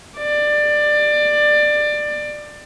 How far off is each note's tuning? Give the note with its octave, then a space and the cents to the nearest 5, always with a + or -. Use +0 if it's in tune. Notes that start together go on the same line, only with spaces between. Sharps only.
D5 +20